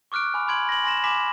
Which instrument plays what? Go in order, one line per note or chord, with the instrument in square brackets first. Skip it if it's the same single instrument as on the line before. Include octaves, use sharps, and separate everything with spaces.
[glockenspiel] C#6 D6 F6 F#6 D7
G#5 B5 D6
B5 C6 G#6 D7 F#7
A#6 F#7
G#5 C6 A#6 E7
G#5 B5 D6 B6 E7